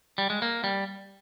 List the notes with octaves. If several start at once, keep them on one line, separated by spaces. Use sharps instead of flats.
G3
G#3
A#3
G3